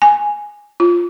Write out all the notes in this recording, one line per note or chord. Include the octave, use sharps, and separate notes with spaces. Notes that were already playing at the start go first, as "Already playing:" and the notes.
G#5
F4